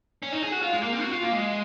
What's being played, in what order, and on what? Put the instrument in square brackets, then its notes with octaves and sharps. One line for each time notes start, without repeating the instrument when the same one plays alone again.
[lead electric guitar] C#4
D#4
G#4
F#4
F4
G#3
A#3
C4
F#4
F4
A#3
G#3